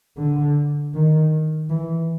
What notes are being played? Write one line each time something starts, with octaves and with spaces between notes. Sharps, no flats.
D3
D#3
E3